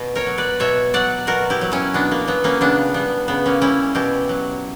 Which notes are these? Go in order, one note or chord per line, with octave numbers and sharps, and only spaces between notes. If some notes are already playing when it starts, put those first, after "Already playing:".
Already playing: B2
A#4 C#5
F#3
B4 D5
B2 C#5 E5
F#3 D5 F#5
B2 F#4 A#4
E4 G4
F#3
C#4 E4
B2 B3 D4
A#3
F#3 B3
A#3 C#4
C#3 B3 D4
G3 B3
C#3 B3
A#3 C#4
G3 C#4 E4
B2 E4 G4
F#3